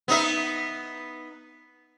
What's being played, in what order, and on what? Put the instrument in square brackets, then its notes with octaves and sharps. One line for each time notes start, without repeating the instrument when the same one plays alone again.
[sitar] B3 D#4 E5